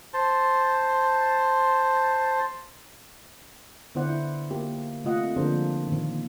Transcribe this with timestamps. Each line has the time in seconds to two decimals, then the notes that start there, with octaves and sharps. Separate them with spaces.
0.14 C5 A5
3.95 D3 B3 E4 C5 D5 F#5
4.10 E4
4.51 A#3 G4
5.04 C3 A3 F4 D#5 F#5
5.36 D3 F3 A#3 D4 G#4 C5
5.87 A#2 D#3